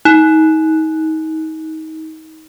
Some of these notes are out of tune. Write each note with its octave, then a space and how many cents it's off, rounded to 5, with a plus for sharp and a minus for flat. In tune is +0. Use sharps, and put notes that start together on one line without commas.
D#4 +30